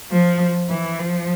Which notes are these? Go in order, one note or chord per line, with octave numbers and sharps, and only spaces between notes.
F3
E3
F3